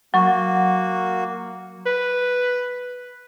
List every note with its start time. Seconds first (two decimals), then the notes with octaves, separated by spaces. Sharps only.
0.14 F#3 A#3 F#4 C#6
1.86 B4